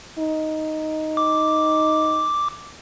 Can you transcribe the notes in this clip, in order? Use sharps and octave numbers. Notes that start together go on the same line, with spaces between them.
D#4
D6